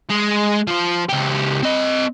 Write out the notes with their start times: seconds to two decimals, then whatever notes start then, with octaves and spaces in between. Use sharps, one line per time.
0.10 G#3
0.67 F3 F4
1.09 C#2 G4
1.63 C4 D#5